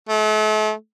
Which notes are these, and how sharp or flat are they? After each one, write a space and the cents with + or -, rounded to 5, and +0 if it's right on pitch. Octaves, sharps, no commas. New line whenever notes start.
A3 -40